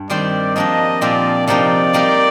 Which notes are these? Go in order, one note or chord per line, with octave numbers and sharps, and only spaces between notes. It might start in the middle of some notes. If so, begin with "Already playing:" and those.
Already playing: G2
D#3 G3 C4 G4 C5 D5
F3 A#3 D4 G4 D#5
A#2 F3 C4 G4 D5
C3 F3 A#3 D#4 G4 D5
G3 A#3 D#4 G4 A#4